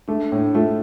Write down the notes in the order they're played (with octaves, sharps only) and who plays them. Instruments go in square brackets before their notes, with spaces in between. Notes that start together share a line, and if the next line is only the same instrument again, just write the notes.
[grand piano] A3 [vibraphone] D4
[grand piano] A2
[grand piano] A3 [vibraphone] F4